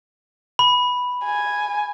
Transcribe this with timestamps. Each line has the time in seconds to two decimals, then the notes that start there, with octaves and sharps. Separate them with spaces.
0.59 B5
1.26 G#5